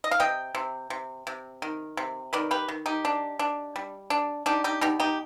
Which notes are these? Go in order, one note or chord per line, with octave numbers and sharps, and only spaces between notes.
D#5
F5
C3 D#5 G5
C3
C3
C3
D#3
C3
D#3 B4 D5
G4 B4
D#3
D#4 G4
D4
D4
G3
D4
D4 D#4 G4
D#4 G4
B2 D#4 G4
D#4 G4